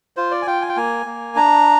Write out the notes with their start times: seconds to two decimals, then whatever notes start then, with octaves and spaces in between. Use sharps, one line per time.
0.17 F4 C5
0.31 D5
0.42 G#5
0.46 F4 G5
0.61 G#5
0.69 G5
0.76 A#3 G#5
1.06 A#3
1.36 D4 A#5